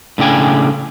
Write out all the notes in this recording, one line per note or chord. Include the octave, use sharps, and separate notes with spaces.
A2 C#3 D4 G5 G#5